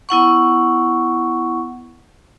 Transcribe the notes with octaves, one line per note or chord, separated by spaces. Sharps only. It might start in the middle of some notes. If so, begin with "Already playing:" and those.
B3 E4 F#5 C#6